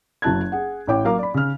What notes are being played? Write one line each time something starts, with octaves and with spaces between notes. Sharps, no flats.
F#1 F#3 E4 A5 F#6 G#6
G#4 F#5
A1 E4 C#5 G5 D6
F#3 A#3 F5 A#5 D6
D5 B5
C#3 F6